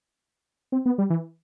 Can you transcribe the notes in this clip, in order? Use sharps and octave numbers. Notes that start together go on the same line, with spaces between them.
C4
B3
G3
E3